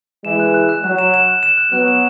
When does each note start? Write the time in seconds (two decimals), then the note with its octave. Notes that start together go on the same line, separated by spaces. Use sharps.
0.24 E3 G#3 E7
0.39 F#6
0.54 F#6
0.69 F#6
0.84 F#3 F#6
0.98 E7
1.14 E7
1.28 F#6
1.43 E7
1.58 F#6
1.72 F#3 B3 F#6
1.88 E7